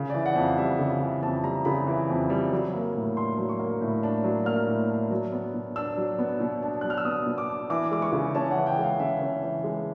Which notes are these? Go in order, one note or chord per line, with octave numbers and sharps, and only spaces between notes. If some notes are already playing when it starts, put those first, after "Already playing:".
Already playing: C#3
D5
E3
F#5
F2
F5
G3 E5
C#3
F5
E3
F2 A5
G3 A#5
C#3 B5
E3
F2
G3
F#3
A#3
A2
D4 C6
F#3
C#6
A#3
A2
D4
F#3
A#3 F6
A2
D4
F#3
B3
B2
D4 E6
F#3
B3
B2
D4
F#3 F#6
F6
E6
B3 D#6
B2
D6
D4
E3 D6
G#3 D6
C#6
C#3
C#4 A5
F#5
E3
G5
G#3 F5
C#3 E5
C#4
E3
G#3